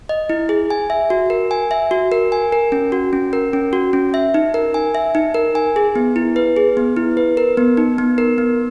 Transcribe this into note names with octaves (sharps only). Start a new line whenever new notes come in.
D#5
E4
G#4
G#5
E5
F#4
A#4
G#5
E5
F#4
A#4
G#5
A#4
C#4
F#4
C#4
A#4
C#4
F#4
C#4
E5
D#4
A#4
G#5
E5
D#4
A#4
G#5
G#4
B3
E4
B4
G#4
B3
E4
B4
A#4
B3
D#4
B3
A#4
B3